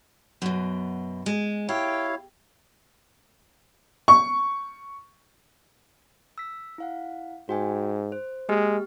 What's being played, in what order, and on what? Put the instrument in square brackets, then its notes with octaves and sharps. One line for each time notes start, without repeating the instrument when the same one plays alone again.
[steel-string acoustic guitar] F#2 B2
G#3
[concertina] E4 C#5 F5 [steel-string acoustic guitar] G4
[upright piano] C#6
[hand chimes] E6 B6
E4 F5 F#5
[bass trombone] G#2 [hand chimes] F#4 G5 G#5
[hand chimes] C5
[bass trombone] G#3 [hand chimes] A#3 G4 F6